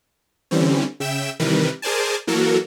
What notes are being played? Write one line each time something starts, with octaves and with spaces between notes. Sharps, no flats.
D3 E3 G3 C4 C#4
C#3 E5 G5 E7
C3 D#3 E3 G3 A#4 B4
G#4 A#4 C5 D5 G#5 A5
E3 F#3 A#3 F#4 A4 A#4